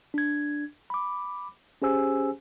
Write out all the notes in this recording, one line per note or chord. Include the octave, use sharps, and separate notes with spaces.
D4 G#6
B5 D6
C#4 G4 G#4 C5 G#5 E6